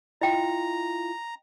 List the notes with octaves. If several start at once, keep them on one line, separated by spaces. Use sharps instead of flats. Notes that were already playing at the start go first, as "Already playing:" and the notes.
E4 F4 D#5 G5 A#5